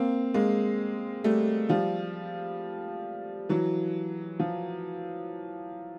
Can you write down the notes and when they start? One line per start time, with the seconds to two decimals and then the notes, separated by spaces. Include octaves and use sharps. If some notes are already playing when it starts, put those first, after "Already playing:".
Already playing: A#3 C4
0.34 G#3 A#3
1.24 G3 A3
1.69 F3 G3
3.49 E3 F#3
4.39 F3